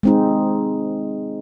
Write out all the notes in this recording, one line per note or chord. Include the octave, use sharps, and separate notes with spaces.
G#3 C4 D#4